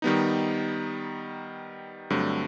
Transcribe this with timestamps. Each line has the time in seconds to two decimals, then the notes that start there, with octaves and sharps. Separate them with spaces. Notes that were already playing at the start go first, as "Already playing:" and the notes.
0.02 D#3 G3 B3 D#4
2.10 G2 D3 F#3 A3 C4